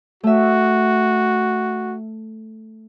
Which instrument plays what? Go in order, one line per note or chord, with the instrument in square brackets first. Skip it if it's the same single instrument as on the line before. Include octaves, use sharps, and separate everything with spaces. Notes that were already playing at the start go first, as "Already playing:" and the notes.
[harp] A3 E5 [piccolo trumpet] F#4